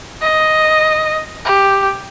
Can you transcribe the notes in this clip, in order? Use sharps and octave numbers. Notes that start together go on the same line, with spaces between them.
D#5
G4